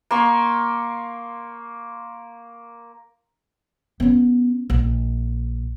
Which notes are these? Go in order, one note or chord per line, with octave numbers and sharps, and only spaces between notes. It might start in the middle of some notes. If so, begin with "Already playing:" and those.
A#3 C6 C#6
B3 C#4
A#1